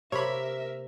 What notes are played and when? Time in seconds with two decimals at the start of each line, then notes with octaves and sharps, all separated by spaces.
0.12 C3 A#3 A#4 C#5 E5 B5